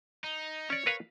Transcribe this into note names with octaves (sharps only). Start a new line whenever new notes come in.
D#4
C#4 C#5 D5
A#4 B4 F5